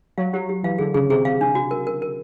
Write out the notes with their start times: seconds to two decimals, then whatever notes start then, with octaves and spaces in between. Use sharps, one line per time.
0.18 F#3 F5
0.33 F#3 G4
0.49 G4
0.63 E3 F5
0.78 D3 G#4
0.94 C#3 G#4
1.09 C3 G#4
1.25 C3 F5
1.41 D4
1.55 F#4
1.71 A#4
1.87 A#4
2.02 A#4